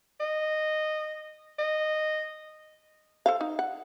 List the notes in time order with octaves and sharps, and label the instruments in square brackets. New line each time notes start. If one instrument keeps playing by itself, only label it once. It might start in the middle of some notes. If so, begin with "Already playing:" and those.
[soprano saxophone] D#5
D#5
[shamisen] A4 C5 F5
D#4
F#5